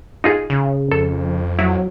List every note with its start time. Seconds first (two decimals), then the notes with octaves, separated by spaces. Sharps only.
0.24 D#4 F4 G#4
0.50 C#3
0.92 F2 A4
1.59 F#3 E4